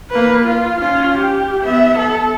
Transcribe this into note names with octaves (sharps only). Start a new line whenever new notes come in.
A#3 B4
F4
C#4 F4
G4
B3 E5
A4